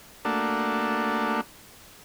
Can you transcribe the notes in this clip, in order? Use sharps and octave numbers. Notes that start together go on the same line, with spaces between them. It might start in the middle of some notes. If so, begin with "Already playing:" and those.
A3 A#3 D4 F#4